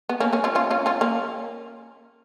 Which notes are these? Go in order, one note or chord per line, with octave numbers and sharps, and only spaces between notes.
B3
A#3 C#4
A#3 C#4
C#4 F4
C#4 F4
C#4 F4
C#4 F4
A#3 C#4